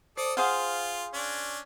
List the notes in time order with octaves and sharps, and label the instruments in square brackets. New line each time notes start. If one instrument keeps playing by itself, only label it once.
[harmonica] A4 D5 D#6 [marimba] C5
[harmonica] F4 [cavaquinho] G#4 C5 F5 [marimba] F#5
[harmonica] C#4 D4